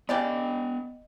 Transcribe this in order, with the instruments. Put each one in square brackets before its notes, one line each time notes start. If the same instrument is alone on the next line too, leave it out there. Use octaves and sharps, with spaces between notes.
[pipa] C#3 G4 D5 [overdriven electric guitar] B3 G5 [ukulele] D#5